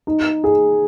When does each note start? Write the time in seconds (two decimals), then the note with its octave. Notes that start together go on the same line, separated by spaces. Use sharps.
0.07 D#4
0.44 G#4